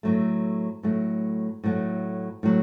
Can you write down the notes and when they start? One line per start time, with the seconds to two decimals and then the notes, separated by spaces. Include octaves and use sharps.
0.03 A2 F#3 A3
0.83 A2 F#3 A3
1.64 A2 F#3 A3
2.43 A2 F#3